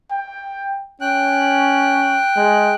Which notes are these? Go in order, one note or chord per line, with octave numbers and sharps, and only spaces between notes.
G5
C#4 G5 F#6
G#3